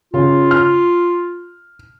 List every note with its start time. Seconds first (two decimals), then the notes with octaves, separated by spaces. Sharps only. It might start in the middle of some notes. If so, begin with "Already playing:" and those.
0.14 C#3 F4
0.51 F6